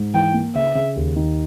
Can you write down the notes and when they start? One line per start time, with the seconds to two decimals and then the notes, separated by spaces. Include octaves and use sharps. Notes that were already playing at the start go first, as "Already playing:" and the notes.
Already playing: G#2
0.14 E3 G5
0.34 A#3
0.55 C#3 E5
0.75 C#3
0.96 D#2
1.16 D#3